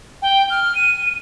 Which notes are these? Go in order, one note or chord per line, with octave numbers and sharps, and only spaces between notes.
G5
F6
D#7